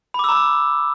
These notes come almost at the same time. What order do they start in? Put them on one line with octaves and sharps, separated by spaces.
B5 D6 E6 A#5